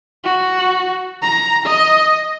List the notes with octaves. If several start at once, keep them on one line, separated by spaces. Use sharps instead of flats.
F#4
A#5
D#5